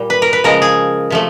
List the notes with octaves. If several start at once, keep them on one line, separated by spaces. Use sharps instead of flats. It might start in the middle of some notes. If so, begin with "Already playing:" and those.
Already playing: A#2 G3
B4
A#4
B4
C#3 F3 G#3 A#4
G#4
C3 F3 A3